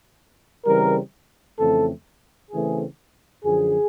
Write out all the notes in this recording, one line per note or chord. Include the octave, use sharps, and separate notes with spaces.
C#3 E3 G3 C4 A#4
F2 C#3 E3 A3 C4 A4
C#3 E3 A3 C4 G#4
F#2 D3 F3 G#4